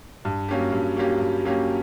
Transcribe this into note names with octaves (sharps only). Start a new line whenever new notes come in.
G2
F#3 A#3 C#4 G4
G2
F#3 A#3 C#4 G4
G2
F#3 A#3 C#4 G4